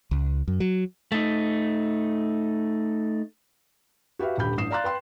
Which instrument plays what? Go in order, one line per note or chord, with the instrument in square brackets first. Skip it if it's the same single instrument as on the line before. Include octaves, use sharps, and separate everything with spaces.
[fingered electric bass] C#2
F#2
F#3
[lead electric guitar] A3 D#4
[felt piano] F#4 G4 B4 E5 F5
D#1 A#1 D3 G4 B5 G6
A1 G2 D#6 C7 E7
D5 F5 A#5 C6 F#6 A6
B4 G5 C6